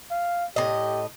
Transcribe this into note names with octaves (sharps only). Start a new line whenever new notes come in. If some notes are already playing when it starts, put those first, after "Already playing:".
F5
A2 C#3 G4 D#5